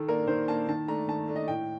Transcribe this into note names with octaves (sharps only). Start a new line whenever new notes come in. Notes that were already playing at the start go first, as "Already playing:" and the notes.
Already playing: D#3 A4
A#3 D4 A#4
D#3 C5
A#3 D4 A5
D#3 A5
A3 D4 A#5
D#3 A5
A3 D4
D#5
A2 G5